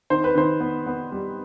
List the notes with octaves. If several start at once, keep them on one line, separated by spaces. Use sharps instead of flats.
D#3 C5
B4
D#3 C5
B3
B3
G3